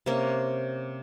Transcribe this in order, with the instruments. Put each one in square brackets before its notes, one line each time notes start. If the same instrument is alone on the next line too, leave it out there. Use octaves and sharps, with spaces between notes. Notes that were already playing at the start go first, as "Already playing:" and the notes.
[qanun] C3 A#3 C#4